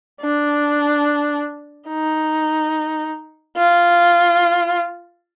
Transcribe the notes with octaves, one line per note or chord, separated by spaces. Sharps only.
D4
D#4
F4